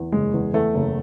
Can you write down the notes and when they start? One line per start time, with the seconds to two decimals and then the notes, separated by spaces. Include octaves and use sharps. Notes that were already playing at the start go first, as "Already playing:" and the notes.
Already playing: E2
0.12 F#1 G#3
0.34 E2
0.54 E2 A3
0.74 F#1